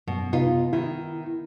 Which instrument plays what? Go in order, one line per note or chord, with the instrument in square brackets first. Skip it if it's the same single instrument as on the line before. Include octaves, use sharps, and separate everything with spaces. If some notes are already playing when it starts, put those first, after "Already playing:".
[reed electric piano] F#2 [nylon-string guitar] B2
[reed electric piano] C3 [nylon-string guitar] B3 D#4 F4
[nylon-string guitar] D#3 [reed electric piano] E4